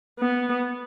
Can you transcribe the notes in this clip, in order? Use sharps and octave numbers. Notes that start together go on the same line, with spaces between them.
B3